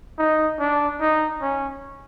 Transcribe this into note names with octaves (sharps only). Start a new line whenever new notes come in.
D#4
D4
D#4
C#4